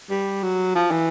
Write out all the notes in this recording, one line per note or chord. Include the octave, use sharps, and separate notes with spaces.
G3
F#3
F3
E3